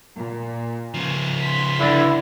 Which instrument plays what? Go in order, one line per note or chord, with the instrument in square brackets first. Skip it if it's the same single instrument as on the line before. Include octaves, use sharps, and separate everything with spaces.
[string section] A#2
[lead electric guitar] C#3 F3
[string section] C6 B6
[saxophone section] G2 D3 [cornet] E4